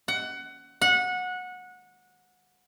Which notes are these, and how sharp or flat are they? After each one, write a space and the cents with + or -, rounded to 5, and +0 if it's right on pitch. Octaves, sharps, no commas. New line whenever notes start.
F#5 +20
F#5 -20